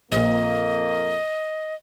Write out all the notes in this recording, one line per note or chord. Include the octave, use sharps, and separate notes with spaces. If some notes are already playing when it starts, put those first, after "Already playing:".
A#1 F2 A#2 A#3 D#5